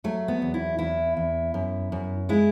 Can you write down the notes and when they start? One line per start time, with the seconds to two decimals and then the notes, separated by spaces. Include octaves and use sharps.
0.04 F#3 A3
0.28 B3
0.42 E2
0.54 E4
0.78 E2 E4
1.17 E2
1.54 F#2
1.92 F#2
2.29 G#3 E4